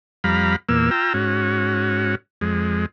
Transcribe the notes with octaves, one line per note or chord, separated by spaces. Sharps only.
F2 G3 F5 A#5 B5
E2 A#2 A#3 E6
F4 G5 A#5 E6
G#2 C#4 F#4
F2 G#3